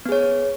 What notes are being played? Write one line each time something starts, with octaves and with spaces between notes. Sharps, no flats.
B3 G#4 C#5